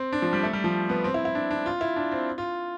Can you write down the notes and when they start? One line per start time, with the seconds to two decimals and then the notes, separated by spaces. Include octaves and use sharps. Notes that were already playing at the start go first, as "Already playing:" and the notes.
Already playing: C4
0.12 D4
0.22 F3
0.33 G3
0.43 A3
0.53 G3
0.64 F3
0.89 B3
1.04 C4
1.14 E4
1.25 E4
1.35 D4
1.51 D4
1.66 F4
1.81 E4
1.96 D4
2.12 C4
2.38 F4